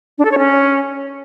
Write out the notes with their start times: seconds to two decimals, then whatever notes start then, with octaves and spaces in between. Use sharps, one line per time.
0.18 D4
0.25 A4
0.32 C#5
0.38 C#4